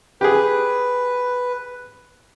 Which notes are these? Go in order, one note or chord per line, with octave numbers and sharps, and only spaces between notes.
G4 G#4 B4